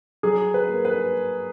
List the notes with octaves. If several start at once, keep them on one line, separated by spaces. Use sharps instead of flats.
F#3 G#4
B4
A#3
B4